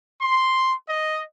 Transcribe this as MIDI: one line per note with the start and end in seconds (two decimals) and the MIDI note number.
0.22 0.73 84
0.89 1.22 75